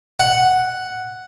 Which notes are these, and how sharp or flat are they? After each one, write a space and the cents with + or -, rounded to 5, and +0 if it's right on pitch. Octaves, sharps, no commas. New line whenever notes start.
F#5 +0